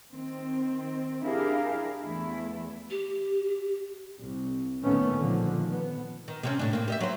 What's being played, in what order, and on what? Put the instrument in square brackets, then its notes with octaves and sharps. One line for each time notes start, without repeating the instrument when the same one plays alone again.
[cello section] D#3 C4
D4 E4 G4 G#4 A#4 F5
E2 A3 E4
[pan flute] G4
[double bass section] C2
A1 A#2 D#3 A3 B3 C#4
A#2 D3 D#3 F3
B3
[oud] D#3
C3 C4 C#4
A2 D4
A#3 C4
G4 D#5 E5
F#3 C5